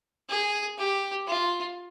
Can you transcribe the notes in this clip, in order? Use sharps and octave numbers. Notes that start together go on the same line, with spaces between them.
G#4
G4
F4